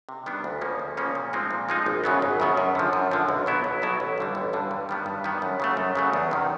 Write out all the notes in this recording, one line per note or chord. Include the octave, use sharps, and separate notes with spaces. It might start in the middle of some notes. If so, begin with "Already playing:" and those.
C3
D#3 G3 B3 D4
D2
C#3 F3 A#3 C#4
D2
C#3 F3 A#3 C#4
A#2
F3 G#3 C4 D#4
A#2
F3 G#3 C4 D#4
G#1
F#2 C#3 F#3 B3
G#1
F#2 C#3 F#3 B3
F#2
D3 F3
F#2
D3 F3
B1
B2 F#3 B3 E4
B1
B2 F#3 B3 E4
A1
G2 D3 G3
A1
G2 D3 G3
G2
D#3 G3 B3
G2
D#3 G3 B3
F#2
C#3 F#3 A3
F#2
C#3 F#3 A3
E2
C3 D#3